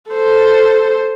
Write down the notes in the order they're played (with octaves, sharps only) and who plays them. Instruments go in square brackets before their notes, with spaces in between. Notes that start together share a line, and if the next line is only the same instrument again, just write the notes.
[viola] A4 C5